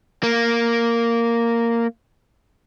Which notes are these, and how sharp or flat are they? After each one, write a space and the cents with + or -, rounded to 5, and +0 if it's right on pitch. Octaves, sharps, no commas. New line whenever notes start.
A#3 -5